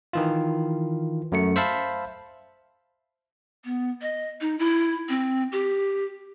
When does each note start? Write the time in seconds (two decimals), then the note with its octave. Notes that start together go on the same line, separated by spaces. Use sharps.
0.13 D#3 E3 F4
1.32 F#2 A3 C#7
1.56 C5 E5 F5 A5 B5
3.65 B3
4.02 D#5
4.41 D#4
4.59 E4
5.09 C4
5.52 G4